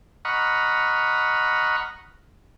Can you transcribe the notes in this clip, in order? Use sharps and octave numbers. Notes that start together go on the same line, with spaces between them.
D#5 F#5 A#5 B5 C#6 F6